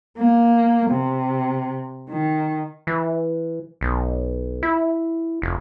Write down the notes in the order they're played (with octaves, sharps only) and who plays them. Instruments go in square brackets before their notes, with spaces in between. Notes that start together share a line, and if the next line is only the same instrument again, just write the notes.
[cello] A#3
C3
D#3
[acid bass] E3
B1
E4
F1